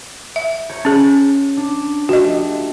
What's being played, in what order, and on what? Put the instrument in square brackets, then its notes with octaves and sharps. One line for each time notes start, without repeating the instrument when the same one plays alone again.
[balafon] E5
[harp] C#5 A#5 G6
[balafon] C#4 G#4
[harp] D4
[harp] G3 A3 F4 [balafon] F#4 D#5